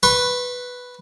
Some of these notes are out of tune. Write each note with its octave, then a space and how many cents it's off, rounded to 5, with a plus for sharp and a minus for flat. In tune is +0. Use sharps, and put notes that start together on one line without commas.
B4 +0 C#6 -45